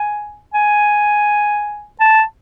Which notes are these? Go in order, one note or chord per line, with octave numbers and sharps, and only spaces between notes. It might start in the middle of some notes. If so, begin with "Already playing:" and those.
Already playing: G#5
G#5
A5